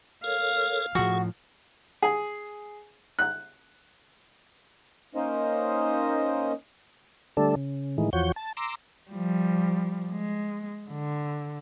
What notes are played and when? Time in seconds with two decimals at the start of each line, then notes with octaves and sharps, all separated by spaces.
0.24 A4 A#4 C#5 F5
0.95 A2 F3 F#4 G#4
2.02 G#4
3.19 F#6
5.15 A#3 C#4 D#4 A#4 C5 D#5
7.37 D3 G3 A3 D4 A4
7.56 C#3
7.98 A2 D#3 E3 G#3
8.13 E2 F3 F#4 C#5 G6
8.36 A5
8.57 A#5 C6 D6 E6
9.11 F3 G3
10.12 G#3
10.90 D3